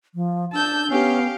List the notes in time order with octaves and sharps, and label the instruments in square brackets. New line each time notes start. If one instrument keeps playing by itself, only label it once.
[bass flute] F3
[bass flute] D4 [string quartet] A5 E6 G6
[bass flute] B3 [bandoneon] C#4 [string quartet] G4 F5